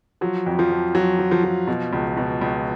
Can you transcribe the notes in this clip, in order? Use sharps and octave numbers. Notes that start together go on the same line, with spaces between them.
F3 F#3
F2
F3
F2
F3 F#3
F3
F3
F3
B2
C#2
B2
C#2